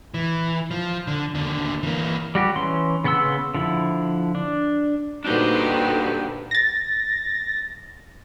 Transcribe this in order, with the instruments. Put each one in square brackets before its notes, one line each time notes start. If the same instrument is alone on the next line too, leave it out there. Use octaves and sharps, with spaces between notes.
[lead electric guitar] E3
F3
D3
D#2 D3
E3 A#3
[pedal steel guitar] G3 F#4 G4
E3 C#4 C6
C#3 B3 F#5 C6 E6
D3 F3 E4
D4
[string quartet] A#2 D3 B3 [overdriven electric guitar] D4 G4 [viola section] D#4 F#4 C5
[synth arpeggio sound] A6 A#6